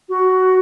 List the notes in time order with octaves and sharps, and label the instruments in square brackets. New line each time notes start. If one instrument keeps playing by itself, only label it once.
[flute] F#4